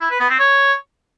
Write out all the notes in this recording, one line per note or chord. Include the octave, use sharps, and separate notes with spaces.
E4
B4
B3
C4
C#5